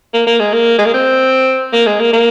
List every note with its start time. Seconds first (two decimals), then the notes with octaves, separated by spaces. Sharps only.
0.14 A#3
0.27 A#3
0.40 G#3
0.53 A#3
0.79 G#3
0.86 A#3
0.94 C4
1.73 A#3
1.86 G#3
2.00 A#3
2.13 A#3